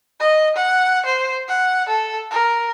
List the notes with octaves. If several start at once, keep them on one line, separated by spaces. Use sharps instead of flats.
D#5
F#5
C5
F#5
A4
A#4